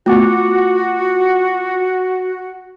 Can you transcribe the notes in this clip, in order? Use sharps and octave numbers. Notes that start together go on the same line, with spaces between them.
A3 B3 F4 F#4 D6